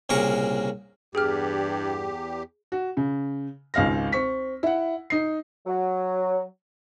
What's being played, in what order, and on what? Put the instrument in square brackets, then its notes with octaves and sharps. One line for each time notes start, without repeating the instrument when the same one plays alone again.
[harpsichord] C2 A#2 C#3 A#4 A#5 C#6
[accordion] E2 G4 [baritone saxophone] G2 [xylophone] G#4 G5 F6
[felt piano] F#4
C#3
G#1 C#2 F5 F6 A#6
C4 C#6 B6
E4 F#5
D#4 C7
[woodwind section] F#3